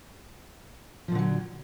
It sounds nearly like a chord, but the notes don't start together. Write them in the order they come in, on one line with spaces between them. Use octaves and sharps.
F3 A#2 D3 F#3